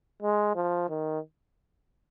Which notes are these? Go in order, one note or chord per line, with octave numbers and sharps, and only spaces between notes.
G#3
F3
D#3